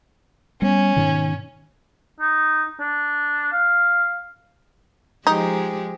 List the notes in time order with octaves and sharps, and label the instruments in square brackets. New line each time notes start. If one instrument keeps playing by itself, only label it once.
[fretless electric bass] G3 B3 [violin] C#4
[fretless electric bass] G#2 B2 D#3
[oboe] D#4
D4
F5
[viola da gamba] F3 G#3 G4 [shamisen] D#4